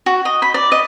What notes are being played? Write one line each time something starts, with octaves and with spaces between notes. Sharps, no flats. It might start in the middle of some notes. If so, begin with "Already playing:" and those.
F#4
D#5
B5
D5
D#5